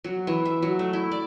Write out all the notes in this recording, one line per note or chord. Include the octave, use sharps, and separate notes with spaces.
F#3
E3
E5
F#3
A3
E4
D5